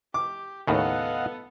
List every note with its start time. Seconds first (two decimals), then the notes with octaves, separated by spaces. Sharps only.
0.14 G4 D6
0.68 D#2 A2 C#3 B3 A4 D#5 F5 F#5